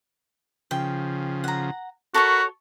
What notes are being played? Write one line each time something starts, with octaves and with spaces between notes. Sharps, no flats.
C#3 F3 G5
F#5 A#5
F#4 A4 A#4 C#5 B5 C#6